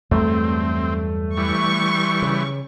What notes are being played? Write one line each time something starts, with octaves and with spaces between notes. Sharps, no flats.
E2 G2 F#3 A3 C4
E3 G3 C#6
C#3